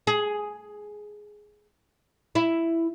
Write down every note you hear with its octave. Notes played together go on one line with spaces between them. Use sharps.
G#4
E4